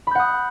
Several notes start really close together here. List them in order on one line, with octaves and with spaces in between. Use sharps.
B5 G6 F#5 D#6